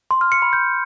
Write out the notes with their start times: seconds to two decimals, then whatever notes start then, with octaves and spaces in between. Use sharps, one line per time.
0.11 C6
0.21 F6
0.32 C#7
0.42 B5
0.53 G6